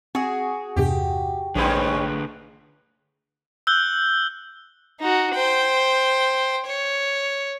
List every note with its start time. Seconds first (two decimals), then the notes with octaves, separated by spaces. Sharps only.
0.15 C4 F#4 G#4
0.76 E2 G2 C3 G4
1.55 A#1 G2 D3 C4 C#4 G#4 B4 B5
3.67 E6 F#6 G6 G7
5.00 D#4 F#4
5.35 C5 G5
6.66 C#5